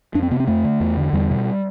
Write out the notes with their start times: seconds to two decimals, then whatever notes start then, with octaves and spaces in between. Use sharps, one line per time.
0.14 F2 D4
0.23 C4
0.31 C3 B3
0.40 C4
0.47 F2 A3
0.64 D3
0.80 E2
0.97 D3
1.13 E2 G3
1.30 B2